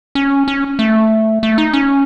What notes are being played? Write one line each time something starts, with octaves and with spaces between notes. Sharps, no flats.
C#4
C#4
A3
A3
D#4
C#4